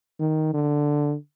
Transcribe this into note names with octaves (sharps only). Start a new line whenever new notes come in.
D#3
D3